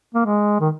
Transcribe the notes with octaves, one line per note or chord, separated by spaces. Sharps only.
A#3
G#3
D#3